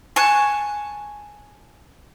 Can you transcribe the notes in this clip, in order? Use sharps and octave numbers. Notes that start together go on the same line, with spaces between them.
G#5 A5 C#6 F#6